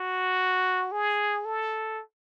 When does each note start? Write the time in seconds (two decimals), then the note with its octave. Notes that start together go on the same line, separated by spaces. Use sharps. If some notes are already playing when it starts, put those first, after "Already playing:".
Already playing: F#4
0.92 G#4
1.45 A4